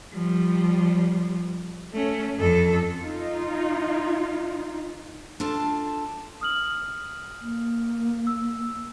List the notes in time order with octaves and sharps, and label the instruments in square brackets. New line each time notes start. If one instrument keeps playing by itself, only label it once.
[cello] F3 G3
A3 C#4
F2 A4
[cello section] D#4 F4
[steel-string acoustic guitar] D4 F4 A4 A5
[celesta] D#6 F6 F#7
[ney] A#3
[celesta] E6